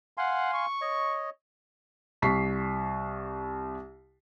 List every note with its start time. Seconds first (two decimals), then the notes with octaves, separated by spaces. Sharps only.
0.18 F5 F#5 G#5 C6
0.52 C#6
0.81 C#5 D#5
2.22 C2 C#6 B6 C7